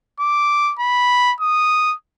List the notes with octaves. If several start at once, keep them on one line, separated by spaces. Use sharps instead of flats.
D6
B5
D#6